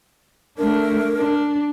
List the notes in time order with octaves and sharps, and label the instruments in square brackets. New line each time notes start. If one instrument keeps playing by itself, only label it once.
[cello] A3 D4 [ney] A#4
[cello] D4